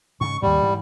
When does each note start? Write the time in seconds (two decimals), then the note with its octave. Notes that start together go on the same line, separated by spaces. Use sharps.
0.21 G#2 C#3 C#6
0.42 D#2 G#2 G3
0.62 G#2 E3